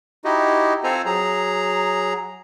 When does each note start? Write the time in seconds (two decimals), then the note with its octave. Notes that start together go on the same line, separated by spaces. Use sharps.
0.25 D#4 E4 F#4 G4 D#5
0.84 C4 F4 A4 C5 G#5 A#5
1.05 F#3 G#4 A#5